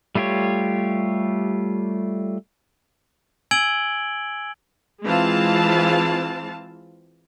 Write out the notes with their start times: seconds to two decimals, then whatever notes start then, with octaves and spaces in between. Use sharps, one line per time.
0.15 G3 A3 F4 G4 C#5
3.51 G#5 E6 G#6 D7 F#7 G7
5.04 E3 G#3 C4 F4 F5 A5